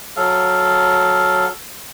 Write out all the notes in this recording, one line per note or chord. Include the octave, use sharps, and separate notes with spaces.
F#3 A4 F5